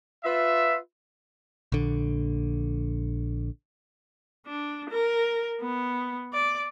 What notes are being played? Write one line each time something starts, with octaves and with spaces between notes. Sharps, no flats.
F4 B4 E5
A#1 D3
D4
A#4
B3
D5